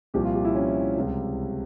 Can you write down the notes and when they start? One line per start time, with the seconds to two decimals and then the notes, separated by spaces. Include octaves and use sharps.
0.14 C2 A#2 F3 G4
0.25 F4
0.35 G4
0.45 E4
0.55 C#4
0.96 C#2 C3 G3